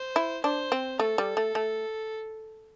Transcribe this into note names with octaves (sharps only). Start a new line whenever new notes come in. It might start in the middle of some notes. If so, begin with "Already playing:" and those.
Already playing: C5
E4
D4 C5
C4
A3 A4
G3
A3
A3